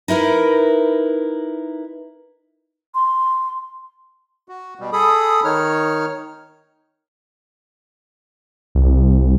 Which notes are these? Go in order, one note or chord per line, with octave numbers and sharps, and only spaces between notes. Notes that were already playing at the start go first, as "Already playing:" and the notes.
D#4 E4 A#4 B4
C6
F#4
B2 G3
G#4 A4 B5 D#6
D#3 D#4 C#5 F6
C2